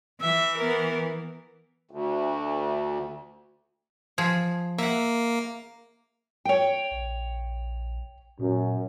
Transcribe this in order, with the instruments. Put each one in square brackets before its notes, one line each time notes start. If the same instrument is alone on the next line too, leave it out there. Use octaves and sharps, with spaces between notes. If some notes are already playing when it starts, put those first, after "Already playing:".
[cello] E3 [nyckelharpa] E5
[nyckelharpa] B3 A#4
[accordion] D2
[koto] F3 G#4
[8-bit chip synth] A#3 [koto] E5 F#5
[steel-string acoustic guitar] C#5 G5
[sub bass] A#1
[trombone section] F#2 [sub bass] A#2